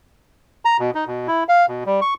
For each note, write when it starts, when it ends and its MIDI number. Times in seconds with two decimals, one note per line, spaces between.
0.65 0.77 82
0.79 0.91 47
0.95 1.04 63
1.07 1.27 47
1.27 1.44 64
1.49 1.66 77
1.68 1.84 47
1.86 2.00 55
2.01 2.14 85